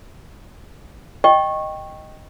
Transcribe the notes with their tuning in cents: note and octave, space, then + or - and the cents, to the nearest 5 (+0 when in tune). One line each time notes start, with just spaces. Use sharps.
D#5 -5 G5 +0 C#6 -20